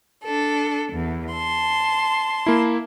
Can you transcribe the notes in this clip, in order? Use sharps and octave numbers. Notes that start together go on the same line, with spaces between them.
D4 A4
E2
A5 C6
A#3 E4